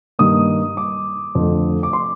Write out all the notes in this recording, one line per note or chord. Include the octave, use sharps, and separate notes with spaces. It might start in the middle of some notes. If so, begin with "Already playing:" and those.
G2 D#3 A#3 D#6
D6
F2 D3 A3
D6
C6